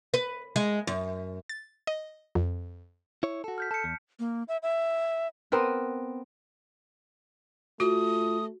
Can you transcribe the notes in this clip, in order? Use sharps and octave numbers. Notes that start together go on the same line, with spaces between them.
B4
G#3
F#2
A6
D#5
F2
E4 C#5
F#4 A4
F6 G6 B6
A4 A5 C#7
E2
A#3
E5
E5
B3 C4 A#4 B4
A3 F4 F#4 D#6